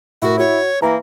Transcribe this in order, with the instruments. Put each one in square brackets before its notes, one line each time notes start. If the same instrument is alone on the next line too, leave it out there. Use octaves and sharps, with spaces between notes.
[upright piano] A2 A#4 [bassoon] E4 [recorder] F#4
[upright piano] F#4 [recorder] C#5
[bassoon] E3 [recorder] A#3 [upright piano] A#5